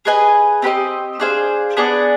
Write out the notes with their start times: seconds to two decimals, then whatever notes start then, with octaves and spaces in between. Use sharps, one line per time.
0.05 G#4 B4 D#5 G#5
0.62 C4 G4 B4 D#5
1.20 D4 G#4 C5 F5
1.77 B3 D4 G#4 D5